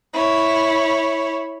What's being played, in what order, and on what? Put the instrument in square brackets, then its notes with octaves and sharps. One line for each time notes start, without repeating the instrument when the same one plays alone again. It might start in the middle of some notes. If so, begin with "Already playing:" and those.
[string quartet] E4 C#5